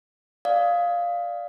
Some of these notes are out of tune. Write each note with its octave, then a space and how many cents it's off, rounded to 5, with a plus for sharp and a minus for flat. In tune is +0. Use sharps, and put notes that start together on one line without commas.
D5 +0 F5 +0 D#6 +20